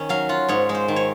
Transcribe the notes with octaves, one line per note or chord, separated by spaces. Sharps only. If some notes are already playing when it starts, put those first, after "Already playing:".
Already playing: D#3 C#4
F#3 F5
F4 F#5
G#2 C#5
G#3
C5
D#3
C#5